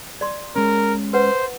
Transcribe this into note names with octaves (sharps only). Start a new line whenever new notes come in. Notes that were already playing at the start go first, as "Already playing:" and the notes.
D5 C6
G#3 C#4 A#4
B4 C5 F#5